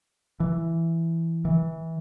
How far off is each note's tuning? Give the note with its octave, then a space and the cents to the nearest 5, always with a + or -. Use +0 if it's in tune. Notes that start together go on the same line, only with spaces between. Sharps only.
E3 +5
E3 -20